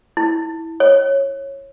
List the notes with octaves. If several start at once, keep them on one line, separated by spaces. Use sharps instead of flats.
E4
C#5